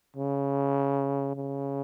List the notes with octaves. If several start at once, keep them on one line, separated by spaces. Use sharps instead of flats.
C#3
C#3